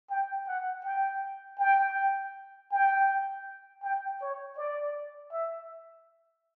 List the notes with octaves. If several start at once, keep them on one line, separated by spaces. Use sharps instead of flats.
G5
F#5
G5
G5
G5
G5
C#5
D5
E5